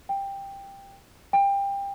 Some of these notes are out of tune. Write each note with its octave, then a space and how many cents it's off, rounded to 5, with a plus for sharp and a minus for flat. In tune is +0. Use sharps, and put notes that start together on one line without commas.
G5 +10
G5 +25